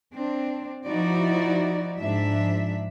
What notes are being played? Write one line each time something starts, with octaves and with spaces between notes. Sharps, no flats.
C4 D4
F3 D#4 E4 F#4 D5
G#2 F3 D4 E5